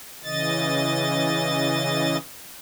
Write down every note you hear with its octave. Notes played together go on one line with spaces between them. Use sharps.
C#3 E3 D#5 A6